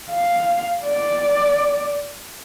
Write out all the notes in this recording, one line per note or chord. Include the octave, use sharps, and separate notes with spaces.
F5
D5